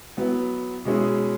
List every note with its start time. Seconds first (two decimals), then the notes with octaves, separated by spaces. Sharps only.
0.17 F#3 B3 E4
0.85 B2 G#3 C#4 E4 G#4